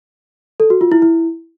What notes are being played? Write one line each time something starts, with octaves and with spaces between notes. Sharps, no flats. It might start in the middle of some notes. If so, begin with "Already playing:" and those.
A4
F#4
F4
E4
E4